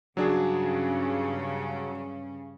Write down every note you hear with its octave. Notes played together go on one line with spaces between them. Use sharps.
G2 C#3 F#3 C#4 D4 G#4